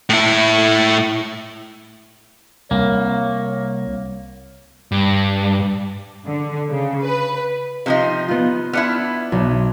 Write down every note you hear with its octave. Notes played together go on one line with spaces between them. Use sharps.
A2 E4
C2 A#3 C#5
G2
D3
C#3
B4
C3 F3 D#4 F5
B3 F4
B3 D4 E4 F6 C#7
B1